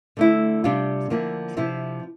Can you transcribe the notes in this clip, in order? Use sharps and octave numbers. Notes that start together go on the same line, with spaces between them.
D3 A3 E4
C3 G3 D4 F4
D3 F3 A#3 E4
C3 F3 C4 E4